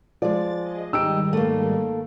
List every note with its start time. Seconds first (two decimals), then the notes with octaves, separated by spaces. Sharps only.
0.22 F3 G#3 D5 A6
0.60 G#4 D#5
0.93 G#2 D#3 G3 D#4 G4 E6 D7
1.33 A3 A#3